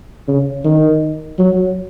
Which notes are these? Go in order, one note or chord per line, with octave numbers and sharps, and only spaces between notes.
C#3
D#3
F#3